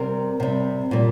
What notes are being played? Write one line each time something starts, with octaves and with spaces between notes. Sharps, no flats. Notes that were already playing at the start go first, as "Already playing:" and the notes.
Already playing: C3 G3 A#4
C3 G3
A#2 G3